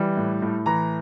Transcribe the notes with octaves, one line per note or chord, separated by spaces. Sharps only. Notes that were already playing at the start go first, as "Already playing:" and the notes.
Already playing: E3 G3
A2
A2
E3 A#5